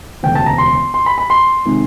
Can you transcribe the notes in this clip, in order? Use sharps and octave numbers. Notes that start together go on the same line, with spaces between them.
E1 D2 C#3 G5
A5
A#5
C6
C6
B5
B5
C6
C3 D#3 G#3